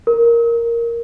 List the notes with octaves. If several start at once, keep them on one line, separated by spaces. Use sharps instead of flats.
A#4